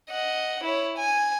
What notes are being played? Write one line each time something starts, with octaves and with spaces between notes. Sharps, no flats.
D#5 F#5
E4 C#5
G#5